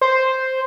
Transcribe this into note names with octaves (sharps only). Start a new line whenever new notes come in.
C5